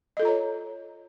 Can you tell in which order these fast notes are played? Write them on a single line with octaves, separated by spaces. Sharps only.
D#5 A4 F4 A#5 C#5